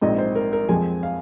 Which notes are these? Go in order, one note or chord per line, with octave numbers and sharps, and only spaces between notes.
A#1 G#2 G#3 C4 D#5
C5
A#4
A#4
F2 F3 G#3 C4 G#5
F5